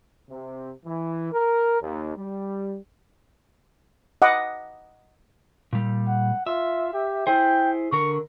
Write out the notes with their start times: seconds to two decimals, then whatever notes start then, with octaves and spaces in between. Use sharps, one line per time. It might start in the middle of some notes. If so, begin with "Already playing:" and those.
0.30 C3
0.86 E3
1.32 A#4
1.82 D#2
2.16 G3
4.22 D#5 F#5 D6
5.73 A#2 G3
6.07 F#5
6.47 F4 E5
6.93 G4
7.27 E4 G#4 C5 G5
7.92 D3 A#4 C#6